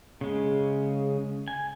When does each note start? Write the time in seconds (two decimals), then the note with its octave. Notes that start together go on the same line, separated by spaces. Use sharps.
0.21 C#3 G#3
1.48 G#5